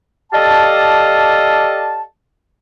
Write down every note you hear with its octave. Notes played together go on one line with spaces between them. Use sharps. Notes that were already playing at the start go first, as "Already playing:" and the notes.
G4 A4 D5 D#5 F5 A5